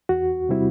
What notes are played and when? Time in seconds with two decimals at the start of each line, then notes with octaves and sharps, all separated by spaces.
0.09 E2 F#4
0.49 C3 G3 C4 E4